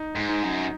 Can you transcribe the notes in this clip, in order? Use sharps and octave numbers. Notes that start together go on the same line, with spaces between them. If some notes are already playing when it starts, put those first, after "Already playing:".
Already playing: D#4
G#2
D#4
F#2